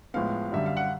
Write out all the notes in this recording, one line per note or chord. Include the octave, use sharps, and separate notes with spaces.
A2 F3 G#3 B3 F5
F#2 D3 G3 E5
F5
F#5